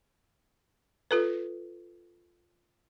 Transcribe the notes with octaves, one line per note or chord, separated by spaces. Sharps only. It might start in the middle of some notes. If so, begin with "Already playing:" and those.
F4 A4 B4